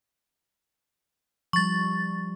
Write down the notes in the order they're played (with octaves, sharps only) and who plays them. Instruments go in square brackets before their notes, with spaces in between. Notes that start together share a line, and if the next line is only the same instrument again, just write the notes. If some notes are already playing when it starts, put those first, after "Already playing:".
[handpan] F3 G3 [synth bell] C#6 A6